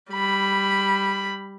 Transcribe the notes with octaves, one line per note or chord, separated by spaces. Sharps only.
G3 B5